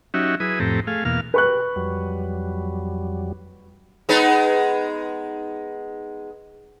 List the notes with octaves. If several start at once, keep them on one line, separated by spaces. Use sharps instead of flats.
F#3 C#4 D#4 F#4 G4 E5
F#3 E4 G#4 B4 D#6
F2 A2 C4 G4 A4 A#5
A3 G#4 F5
E2 B2 A#3 F5 F6
G4 B4 C#6 F#6
F2 F#3 G3
G#3 B3 D#4